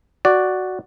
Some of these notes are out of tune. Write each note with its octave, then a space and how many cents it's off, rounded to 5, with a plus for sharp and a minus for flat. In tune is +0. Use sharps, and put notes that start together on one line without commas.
F#4 +0 D5 +0